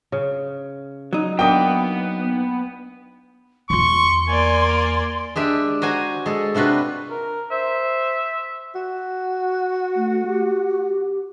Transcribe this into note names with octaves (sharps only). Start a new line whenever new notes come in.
C#3
F#3 D#4
A#3 B3 D4 A#4 B4 G5 D#6
E2 F4 C6 C#6
A#3 D5 G#5
G#3 D4 G4 E5
F#4 C5 G#5 A#5
G#3 A4
C3 D4 F4 F#4 B4
A#4
C5 E5
F#4
A3
G4